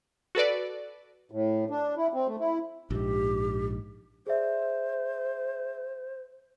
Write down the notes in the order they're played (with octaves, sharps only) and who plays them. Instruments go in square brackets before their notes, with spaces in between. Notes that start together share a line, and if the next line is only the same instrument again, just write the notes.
[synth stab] F#4 A4 B4 D5
[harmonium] A2
D4
E4
C4
A3
E4
[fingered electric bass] A#1 G#2 [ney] G4
[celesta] G#4 D5 E5 [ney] C5